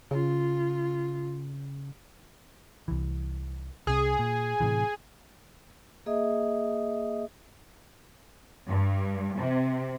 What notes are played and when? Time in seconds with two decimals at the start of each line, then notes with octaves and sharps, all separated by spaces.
0.11 C#3 F4
2.88 C2 E3
3.87 C2 C3 G#4
4.19 A#2
4.60 A2 C3 E3
6.06 A#3 G#4 D#5 E5 D#6
8.68 G2
9.39 C3